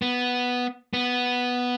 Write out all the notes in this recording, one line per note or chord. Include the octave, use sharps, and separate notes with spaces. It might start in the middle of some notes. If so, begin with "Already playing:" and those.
B3
B3